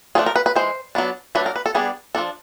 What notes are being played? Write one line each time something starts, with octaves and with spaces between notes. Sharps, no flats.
F3 A3 D4 G#4
A#4
B4
B4
E3 G#3 C5
F#3 B3 D4
F#3 A3 D4 B4
A#4
B4
A4
G3 B3 D4 G#4
F3 A3 D4 A4